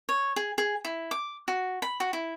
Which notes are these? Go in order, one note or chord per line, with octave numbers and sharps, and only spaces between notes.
C#5
G#4
G#4
E4
D6
F#4
B5
F#4
E4